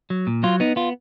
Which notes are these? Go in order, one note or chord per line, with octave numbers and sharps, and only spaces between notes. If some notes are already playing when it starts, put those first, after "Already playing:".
F#3
A#2
F#3 F4
B3 D#4
B3 F4